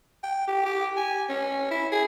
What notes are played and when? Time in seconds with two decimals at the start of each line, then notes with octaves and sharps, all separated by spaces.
0.23 G5
0.48 G4
0.66 G4
0.97 G#5
1.29 C#4
1.71 E4
1.92 G#4